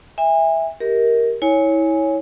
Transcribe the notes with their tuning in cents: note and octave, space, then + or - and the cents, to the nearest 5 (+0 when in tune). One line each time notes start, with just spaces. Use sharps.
E5 -5 G#5 -35
G4 +0 A#4 +0 D#5 +35
E4 -30 C#5 +0 G#5 +0